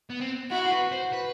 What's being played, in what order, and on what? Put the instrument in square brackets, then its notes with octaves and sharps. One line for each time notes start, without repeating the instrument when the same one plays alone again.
[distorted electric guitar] B3
C4
[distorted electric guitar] E4 [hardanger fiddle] F#4
[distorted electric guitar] C5
B4
C5
B4